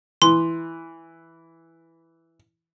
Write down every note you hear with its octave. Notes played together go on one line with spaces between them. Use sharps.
E3 C6